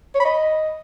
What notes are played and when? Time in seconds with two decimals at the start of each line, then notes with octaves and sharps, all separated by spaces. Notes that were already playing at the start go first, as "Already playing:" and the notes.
0.15 C#5
0.20 B5
0.25 D#5